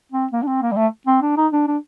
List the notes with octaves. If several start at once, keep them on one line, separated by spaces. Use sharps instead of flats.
C4
A#3
D4
C4
A#3
G3
A3
C4
D4
D#4
D4
D4